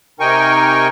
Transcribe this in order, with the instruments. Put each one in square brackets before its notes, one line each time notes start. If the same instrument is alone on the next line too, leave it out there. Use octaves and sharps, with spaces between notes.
[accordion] C3 D#4 A#4 G5 G#5 C#6